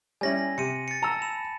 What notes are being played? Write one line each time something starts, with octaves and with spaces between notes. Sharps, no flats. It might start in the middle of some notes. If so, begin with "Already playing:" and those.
G3 C#4 E4 G#5 A#6 F#7
C3 C#7 D#7
A6 C#7
A5 A#5 E6
B5 E7 F7